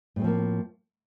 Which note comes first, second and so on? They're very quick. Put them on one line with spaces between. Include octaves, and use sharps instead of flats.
A2 G#3 C4 F3 A#3